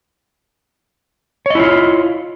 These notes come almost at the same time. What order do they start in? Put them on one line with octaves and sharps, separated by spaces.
C#5 D#5 E4 F4